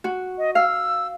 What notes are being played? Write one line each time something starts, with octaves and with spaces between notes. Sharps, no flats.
F#4
D#5
F5 E6